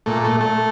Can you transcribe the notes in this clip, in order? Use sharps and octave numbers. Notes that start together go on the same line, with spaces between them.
A#2 A3
A3
A3